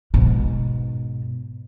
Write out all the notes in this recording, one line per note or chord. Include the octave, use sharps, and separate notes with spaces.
G#2 B2